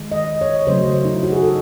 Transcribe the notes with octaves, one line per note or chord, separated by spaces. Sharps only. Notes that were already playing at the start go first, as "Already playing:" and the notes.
Already playing: D#3 G#3
D#5
C#5
D#5
C#3 F#3 A3 C5
D#4
E4
F#4
G#4
A4